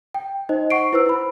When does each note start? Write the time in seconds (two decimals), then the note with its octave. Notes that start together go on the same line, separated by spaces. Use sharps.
0.14 G5
0.49 D#4 C5 D#5
0.70 F#5 C#6 C7 D7
0.93 E4 B4 C5 E6
1.06 E4 B5